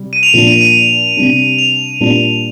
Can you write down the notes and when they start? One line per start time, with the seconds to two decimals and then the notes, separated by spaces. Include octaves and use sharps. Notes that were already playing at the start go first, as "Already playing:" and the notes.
Already playing: C3 G3
0.13 D#7
0.23 F7
0.33 A#2 F3 A#3 D4 F7
0.47 D#7
0.61 D#7
1.17 C3 G3 D4
1.59 F7
2.01 A#2 G3 D4